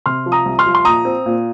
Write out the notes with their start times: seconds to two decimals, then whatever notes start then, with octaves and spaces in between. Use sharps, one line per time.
0.06 C3 C6 F6
0.26 F3
0.32 A#5 D#6
0.46 C2
0.59 C6 F6
0.66 F3
0.75 C6
0.85 A#2 A#5 D#6
1.05 C4
1.26 A#2